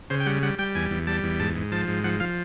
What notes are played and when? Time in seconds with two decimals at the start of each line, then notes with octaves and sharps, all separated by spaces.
0.10 C#3 C5
0.20 G5
0.26 G3 F#5
0.43 G3 F#5
0.59 G3 G5
0.75 E2 G#5
0.91 E2
1.07 G3 A5
1.24 E2
1.39 G#2 A5
1.55 G#2
1.72 F3 A5
1.88 G#2
2.04 F3 F#5
2.20 F3 F5